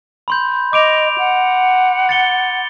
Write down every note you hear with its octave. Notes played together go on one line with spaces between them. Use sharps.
B5 C6 G6
D#5 D6 D7 F7
F#5
A6 C#7 G7